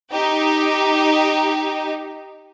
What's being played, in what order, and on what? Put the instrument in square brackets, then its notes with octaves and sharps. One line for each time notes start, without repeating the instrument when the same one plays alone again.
[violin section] D#4 G4